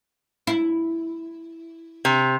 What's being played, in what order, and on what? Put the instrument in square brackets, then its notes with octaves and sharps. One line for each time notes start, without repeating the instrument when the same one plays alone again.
[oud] E4
[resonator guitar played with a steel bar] C3